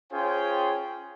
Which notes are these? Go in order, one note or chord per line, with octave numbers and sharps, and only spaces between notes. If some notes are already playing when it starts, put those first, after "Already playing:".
C#4 F4 G#4 C5 G5